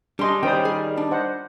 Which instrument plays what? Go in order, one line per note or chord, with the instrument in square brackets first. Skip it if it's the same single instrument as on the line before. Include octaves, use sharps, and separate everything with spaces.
[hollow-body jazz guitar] G3 C6 [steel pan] D4 G#4 D#5
[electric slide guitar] D#3 G3 [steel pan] C#4 C5 D#6 [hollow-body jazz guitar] G5
[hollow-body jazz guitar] G#4
D4
[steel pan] C5 D#5 F#5